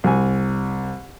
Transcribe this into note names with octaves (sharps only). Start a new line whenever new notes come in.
C2 G#5